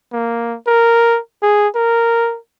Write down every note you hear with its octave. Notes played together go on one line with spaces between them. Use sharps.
A#3
A#4
G#4
A#4